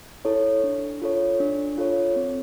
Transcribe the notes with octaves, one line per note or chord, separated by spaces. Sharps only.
E4 A4 C#5
D4
F4 A4 C#5
D4
F4 A4 C#5
C4